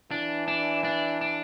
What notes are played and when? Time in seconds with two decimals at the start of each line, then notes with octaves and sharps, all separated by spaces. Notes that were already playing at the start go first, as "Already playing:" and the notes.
0.11 E3 D4
0.48 D4
0.84 D4
1.21 D4